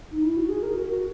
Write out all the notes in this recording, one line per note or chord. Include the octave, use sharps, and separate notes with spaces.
D#4
E4
F#4
G#4
A#4
F#4
F#4